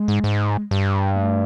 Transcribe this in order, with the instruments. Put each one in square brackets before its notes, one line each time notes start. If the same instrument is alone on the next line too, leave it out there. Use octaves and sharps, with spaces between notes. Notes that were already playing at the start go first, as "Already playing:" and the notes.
Already playing: [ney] G#3
[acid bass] G#2
G#2
G2
[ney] A#3
A3